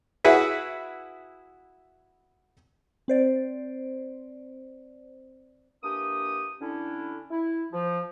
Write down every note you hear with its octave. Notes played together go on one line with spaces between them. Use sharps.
E4 F#4 G#4 B4 E5
C4 C5 D5
E3 A#3 D4 G4 D#6
D3 C#4 D4 E4
E4
F3